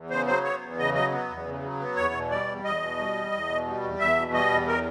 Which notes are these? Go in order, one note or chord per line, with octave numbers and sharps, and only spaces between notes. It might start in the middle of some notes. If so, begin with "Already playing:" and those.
Already playing: E2
C#3 C5
F#3 C5
B3 C#5
E2
C#3 D#5
F#3 D#5
B3
E2
C#3
F#3
B3
E2 C#5
B2
G3 D5
E2
E2 D#5
B2
G3
E2
E2
B2
G3
E2
E2 E5
B2
G3 D#5
E2
A#4